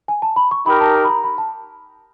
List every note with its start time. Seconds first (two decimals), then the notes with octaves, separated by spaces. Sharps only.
0.08 G#5
0.22 A5
0.36 B5
0.51 C#6
0.66 D#4 G4 A#4 B5
0.80 A5
0.95 A#5
1.04 B5
1.09 A#5
1.24 B5
1.38 A5